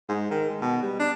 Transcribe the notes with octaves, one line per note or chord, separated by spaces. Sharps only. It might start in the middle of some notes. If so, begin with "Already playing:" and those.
G#2
D#3
G#3
B2
G3
D4